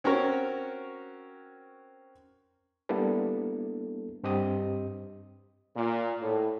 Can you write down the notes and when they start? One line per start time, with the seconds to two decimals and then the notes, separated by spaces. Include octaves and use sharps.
0.04 C4 C#4 F#4 A#4 C#5
2.89 G3 A#3 B3 D4 E4 A4
4.23 G2 C4 G4 D#5 D#6
5.76 A#2
6.21 A2